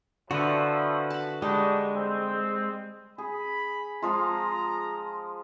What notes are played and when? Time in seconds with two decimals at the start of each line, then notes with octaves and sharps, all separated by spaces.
0.31 D3 F3 A3 E4 F#4 B4
1.10 A5 B5
1.42 G3 G#3 D4 D#4 F#4
1.93 C4
3.18 G#4 B5
4.02 F3 G#3 F4 A#5